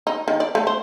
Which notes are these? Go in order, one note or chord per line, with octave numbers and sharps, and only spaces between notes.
D#4
D#3
D5
A3
C5